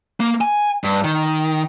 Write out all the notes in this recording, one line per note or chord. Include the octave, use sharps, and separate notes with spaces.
A#3
G#5
G2
D#3